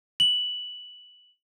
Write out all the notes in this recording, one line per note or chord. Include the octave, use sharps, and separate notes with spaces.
F#7